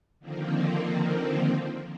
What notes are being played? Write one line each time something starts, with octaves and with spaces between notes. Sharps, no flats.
D3 D#3 F3 A#3 C4